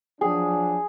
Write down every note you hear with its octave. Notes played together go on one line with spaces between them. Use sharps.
F3 F#3 D4 G#4